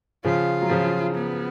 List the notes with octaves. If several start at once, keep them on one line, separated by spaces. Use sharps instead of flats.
C#3 F3 F4
F#3
C#3 F3
B3